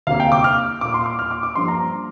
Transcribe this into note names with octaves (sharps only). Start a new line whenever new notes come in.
D2 C3 A#3 F5
G5
D6
F6
A#2 A#3 D6
C6
D6
F6
D6
D6
G2 F3 A#3 C6
A#5